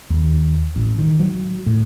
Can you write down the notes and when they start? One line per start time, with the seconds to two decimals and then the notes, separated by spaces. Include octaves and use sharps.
0.10 D#2
0.76 A1
0.99 D#3
1.20 F#3
1.66 A2